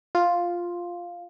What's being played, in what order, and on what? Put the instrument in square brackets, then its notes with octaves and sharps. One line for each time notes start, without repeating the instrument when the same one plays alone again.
[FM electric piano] F4